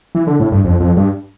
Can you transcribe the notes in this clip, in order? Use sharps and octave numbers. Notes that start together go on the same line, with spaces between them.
E3
D3
A2
G2
F2
F2
G2